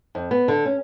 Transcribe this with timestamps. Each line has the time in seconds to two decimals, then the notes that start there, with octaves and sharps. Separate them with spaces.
0.15 F2
0.31 B3
0.48 D3
0.66 C#4